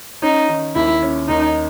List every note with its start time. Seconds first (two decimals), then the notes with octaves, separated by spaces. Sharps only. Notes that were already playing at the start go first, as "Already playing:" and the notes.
0.22 C#4 D#4
0.49 D#3
0.75 D#2 E4
1.03 C#4
1.28 D#2 D#4